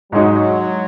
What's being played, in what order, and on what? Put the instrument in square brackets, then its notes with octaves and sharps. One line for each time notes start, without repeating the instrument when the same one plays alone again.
[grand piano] G#2 G#3 D#4 F#4 [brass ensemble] F#3